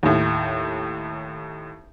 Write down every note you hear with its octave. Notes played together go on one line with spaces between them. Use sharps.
D#2 A2